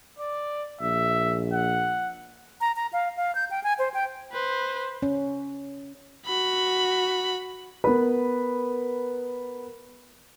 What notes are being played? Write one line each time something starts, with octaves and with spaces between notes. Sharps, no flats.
D5
A#1 E5
F#5
A#5
A#5
F5
F5
G6
G5
G#5
C5
G5
B4 C5
C#4
F#4 B5
B3 A#4 B4